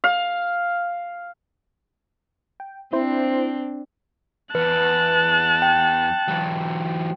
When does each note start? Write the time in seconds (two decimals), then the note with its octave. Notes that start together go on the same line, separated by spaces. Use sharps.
0.04 F5
2.60 G5
2.93 C4 D4 E4 C5
4.55 E2 B4 A5 F#6
5.62 G5
6.28 E3 F#3